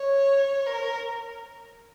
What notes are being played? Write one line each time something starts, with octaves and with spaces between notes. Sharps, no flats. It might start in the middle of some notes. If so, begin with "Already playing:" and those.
Already playing: C#5
A#4